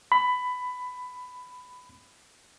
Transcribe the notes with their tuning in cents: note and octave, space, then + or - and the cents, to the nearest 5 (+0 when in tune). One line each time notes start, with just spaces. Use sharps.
B5 +15